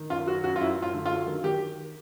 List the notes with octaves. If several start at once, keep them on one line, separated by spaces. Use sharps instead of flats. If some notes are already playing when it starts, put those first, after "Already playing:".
Already playing: D#3
F#2 F4
F#3 F#4
F#2 F#4
F4
F#2 E4
F#2
F4
D3
F4
F#3
D#3
D#3 G4